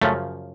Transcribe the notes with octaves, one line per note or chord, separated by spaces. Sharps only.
F#2 C#3 F3 A3